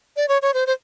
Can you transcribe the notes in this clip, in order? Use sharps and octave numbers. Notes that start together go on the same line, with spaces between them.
D5
C#5
C#5
C5
C5